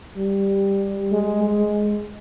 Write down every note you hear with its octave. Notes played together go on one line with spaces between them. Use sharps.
G3
G#3
G#3